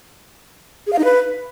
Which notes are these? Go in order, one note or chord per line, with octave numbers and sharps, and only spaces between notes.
G#4
F5
D#4
B4